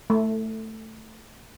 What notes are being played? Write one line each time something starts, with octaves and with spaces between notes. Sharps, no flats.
A3